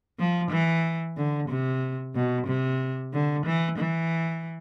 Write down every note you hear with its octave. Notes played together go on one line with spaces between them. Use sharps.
F3
E3
D3
C3
B2
C3
D3
E3
E3